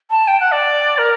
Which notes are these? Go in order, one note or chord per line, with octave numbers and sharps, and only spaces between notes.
A5
G5
F#5
D5
A#4